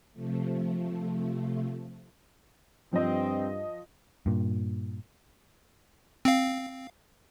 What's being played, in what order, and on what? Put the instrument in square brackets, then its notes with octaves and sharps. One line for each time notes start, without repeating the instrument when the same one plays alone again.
[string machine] C3 F3 A3
[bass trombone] G2 [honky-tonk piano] F3 D#5 [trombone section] C4
[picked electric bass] G2 A#2
[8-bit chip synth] C4 F5